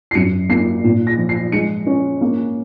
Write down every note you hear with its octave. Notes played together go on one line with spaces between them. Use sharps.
C7
F#2 C#7
A#3 C7
A#2
A#6
F3
C7
G#3 C#7
C#4
A#3